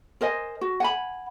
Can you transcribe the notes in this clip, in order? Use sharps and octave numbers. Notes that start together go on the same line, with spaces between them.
A#4 C5 D#5 G#5
F#4
F#5 G#5 B5